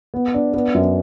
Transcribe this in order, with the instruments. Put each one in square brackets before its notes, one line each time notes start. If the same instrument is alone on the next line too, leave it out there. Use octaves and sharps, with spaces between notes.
[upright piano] B3
D4
B3
F#2